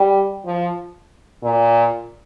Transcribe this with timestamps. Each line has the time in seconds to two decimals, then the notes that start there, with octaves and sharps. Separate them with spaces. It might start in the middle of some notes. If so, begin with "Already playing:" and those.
Already playing: G3
0.45 F3
1.43 A#2